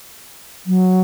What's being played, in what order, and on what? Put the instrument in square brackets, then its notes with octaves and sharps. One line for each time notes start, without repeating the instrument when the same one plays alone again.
[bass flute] F#3